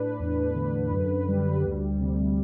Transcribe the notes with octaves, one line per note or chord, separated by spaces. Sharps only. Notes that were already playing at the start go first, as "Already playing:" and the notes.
Already playing: A2 D4 B4
E2
D3
F#2
G3
D2
C3